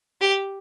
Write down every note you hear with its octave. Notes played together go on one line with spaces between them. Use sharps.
G4